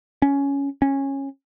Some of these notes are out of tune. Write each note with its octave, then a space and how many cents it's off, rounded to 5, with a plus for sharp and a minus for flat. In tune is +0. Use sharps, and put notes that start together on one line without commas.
C#4 +10
C#4 -15